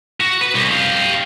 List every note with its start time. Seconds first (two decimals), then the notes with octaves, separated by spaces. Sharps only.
0.20 F#4
0.41 B4
0.55 C2
0.71 G4 F5